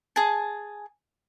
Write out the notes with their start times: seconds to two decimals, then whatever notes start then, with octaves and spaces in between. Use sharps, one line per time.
0.16 G#4 G#5 A5